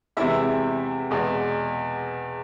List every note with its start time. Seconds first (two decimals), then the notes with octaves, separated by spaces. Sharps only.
0.17 E2 C3 E3 G#3 E4 E5
1.11 E2 B2 G#3